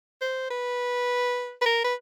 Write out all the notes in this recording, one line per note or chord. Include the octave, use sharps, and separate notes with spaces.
C5
B4
B4
A#4
B4